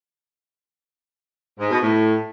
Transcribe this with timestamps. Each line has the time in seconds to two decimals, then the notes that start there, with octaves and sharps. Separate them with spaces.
1.59 G#2
1.70 B2
1.82 A2